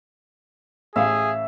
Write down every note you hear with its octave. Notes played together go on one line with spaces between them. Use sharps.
A1 G#4 E5 F5